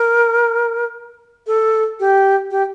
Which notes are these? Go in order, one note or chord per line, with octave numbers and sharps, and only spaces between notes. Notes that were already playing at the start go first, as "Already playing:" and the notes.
Already playing: A#4
A4
G4
G4